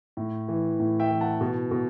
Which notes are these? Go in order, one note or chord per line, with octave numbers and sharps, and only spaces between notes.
A2
E3
A2
E5 G5
E3
F#5 A5
B2
B2